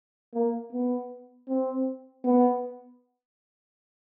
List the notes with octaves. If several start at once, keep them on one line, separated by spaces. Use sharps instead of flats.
A#3
B3
C4
B3